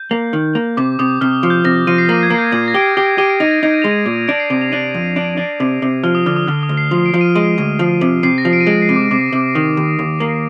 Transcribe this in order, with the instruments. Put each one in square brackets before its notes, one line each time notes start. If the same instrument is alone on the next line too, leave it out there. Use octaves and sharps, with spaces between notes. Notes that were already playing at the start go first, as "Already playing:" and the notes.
Already playing: [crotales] G6
[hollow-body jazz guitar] A#3
D#3
A#3
[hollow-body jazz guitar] C3 [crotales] D6
[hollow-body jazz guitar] C3 [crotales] D#6
[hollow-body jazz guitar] C3 [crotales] F6
[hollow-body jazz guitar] F3
[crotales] G6
[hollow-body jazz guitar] C3 [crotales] A#6
[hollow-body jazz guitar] F3 [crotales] D#7
[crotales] C7
[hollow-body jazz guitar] A#3 [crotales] A#6
[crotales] G#6
[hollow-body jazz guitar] A#3
[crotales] G6
[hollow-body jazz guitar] A#2 [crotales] G#6
[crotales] A#6
[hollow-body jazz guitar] G4 [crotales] D7
[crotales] C7
[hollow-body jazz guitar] G4 [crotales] C7
[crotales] D7
[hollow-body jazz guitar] G4 [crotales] D#7
[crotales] D7
[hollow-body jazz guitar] D#4 [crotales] A#6
[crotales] A#6
[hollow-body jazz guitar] D#4 [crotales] G#6
[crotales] D#7
[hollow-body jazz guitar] G#3 [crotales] F7
[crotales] D#7
[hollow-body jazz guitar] A#2
[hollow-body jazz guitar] D4 [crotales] D7
[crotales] C7
[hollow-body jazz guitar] C3 [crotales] D7
[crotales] F7
[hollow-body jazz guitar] D4 [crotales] D#7
[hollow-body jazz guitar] F2
D4
D4
C3
C3
[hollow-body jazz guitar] F3 [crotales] F6
[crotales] D#6
[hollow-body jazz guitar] D3 [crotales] F6
[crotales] D#6
[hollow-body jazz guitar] D3 [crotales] F6
[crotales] D#6
[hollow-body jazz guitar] D2
[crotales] C7
[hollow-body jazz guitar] F3
[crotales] D7
[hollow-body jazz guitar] F3
[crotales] D#7
[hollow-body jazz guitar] G#3 [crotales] D#7
[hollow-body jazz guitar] D2
F3
C3
[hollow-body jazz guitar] C3 [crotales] C7
[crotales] A#6
[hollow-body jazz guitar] F3
[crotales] D7
D#7
[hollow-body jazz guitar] G#3 [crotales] D7
[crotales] C7
[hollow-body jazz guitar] C3
[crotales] D6
[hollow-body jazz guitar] C3 [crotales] D6
[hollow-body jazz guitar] C3
[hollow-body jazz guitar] D#3 [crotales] D#6
[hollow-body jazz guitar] D#2
D#2
A#3